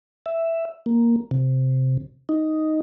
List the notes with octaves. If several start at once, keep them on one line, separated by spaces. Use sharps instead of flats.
E5
A#3
C3
D#4